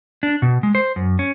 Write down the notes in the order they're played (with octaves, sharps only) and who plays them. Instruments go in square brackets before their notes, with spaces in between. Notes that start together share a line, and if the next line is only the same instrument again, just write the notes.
[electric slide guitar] D4
B2
G#3
C5
F#2
C#4